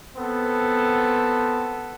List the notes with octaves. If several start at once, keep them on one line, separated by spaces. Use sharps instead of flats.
B3 C4 A4